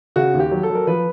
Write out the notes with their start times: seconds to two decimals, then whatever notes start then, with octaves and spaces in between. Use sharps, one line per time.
0.16 C#3 F#4
0.34 D#2
0.40 G4
0.51 F#3
0.63 A4
0.70 F#3
0.75 A#4
0.87 F3 B4